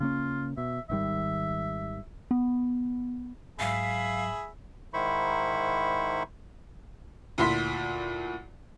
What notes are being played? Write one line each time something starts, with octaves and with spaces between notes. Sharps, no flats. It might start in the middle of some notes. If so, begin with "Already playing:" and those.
C#3 A#3 C#4 F4
B2 E5
G#1 D#3 G3 E5
B3
G#2 F#3 G#4 E5 F5 B5
G#2 D#3 E4 C5 B5 C#6
D2 A#2 E4 C6 B6